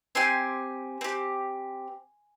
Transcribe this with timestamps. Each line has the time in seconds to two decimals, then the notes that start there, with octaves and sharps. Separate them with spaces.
0.15 C4 G4 G#5 C6
1.01 C4 G4